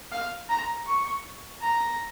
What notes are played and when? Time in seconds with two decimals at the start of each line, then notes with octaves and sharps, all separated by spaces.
0.12 F5
0.49 A#5
0.86 C#6
1.61 A#5